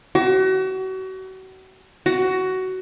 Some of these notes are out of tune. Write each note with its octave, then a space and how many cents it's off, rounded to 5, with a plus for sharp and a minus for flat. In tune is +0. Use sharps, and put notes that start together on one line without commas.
F#4 +35
F#4 +15